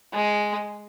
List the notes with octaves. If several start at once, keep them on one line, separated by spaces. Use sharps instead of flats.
G#3